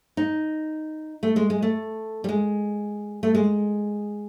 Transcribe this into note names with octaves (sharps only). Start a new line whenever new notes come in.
D#4
A3
G#3
G#3
A3
G3
G#3
A3
G#3